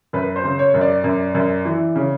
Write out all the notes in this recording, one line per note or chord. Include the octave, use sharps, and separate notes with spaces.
F#2 B4
C5
C#3
C#5
F#2
D5
F#2
F#2
E3
C#3